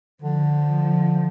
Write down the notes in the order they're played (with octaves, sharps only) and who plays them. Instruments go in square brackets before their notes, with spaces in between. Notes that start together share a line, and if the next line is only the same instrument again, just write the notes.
[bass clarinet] D3 [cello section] F3